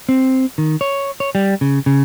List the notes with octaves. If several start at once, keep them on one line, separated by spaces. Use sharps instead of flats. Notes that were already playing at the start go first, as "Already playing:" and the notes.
C4
D#3
C#5
C#5
G3
C#3
C#3